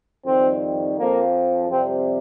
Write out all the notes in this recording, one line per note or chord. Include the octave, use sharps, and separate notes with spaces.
F2 D#3 G3 C4
F2 F3 A#3
F2 C3 G3 C4